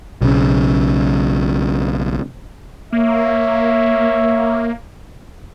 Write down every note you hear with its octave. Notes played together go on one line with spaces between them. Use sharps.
B1 C#3
A#3 C#5 E5